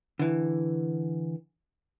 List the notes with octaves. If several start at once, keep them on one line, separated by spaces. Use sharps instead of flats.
D3 E3